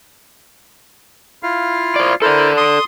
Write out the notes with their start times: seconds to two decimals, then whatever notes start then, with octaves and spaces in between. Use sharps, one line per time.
1.43 E4 F4 F5
1.96 C5 D5
2.22 E4 A4 A#4 C5 D5
2.57 C6 D#6